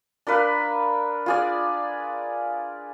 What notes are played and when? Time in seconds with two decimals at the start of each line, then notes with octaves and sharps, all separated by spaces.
0.27 D4 A#4 B4 F5
1.26 F4 G#4 D5